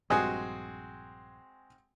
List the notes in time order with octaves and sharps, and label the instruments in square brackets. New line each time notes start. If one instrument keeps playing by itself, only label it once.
[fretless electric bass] A#1 G2 [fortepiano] G#3 C4 F#4 [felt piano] G#5 D#6